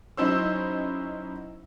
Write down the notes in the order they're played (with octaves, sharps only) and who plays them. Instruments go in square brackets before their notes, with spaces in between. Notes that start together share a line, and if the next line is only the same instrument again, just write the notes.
[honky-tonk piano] F#3 C#4 D#4 E4 C5 E6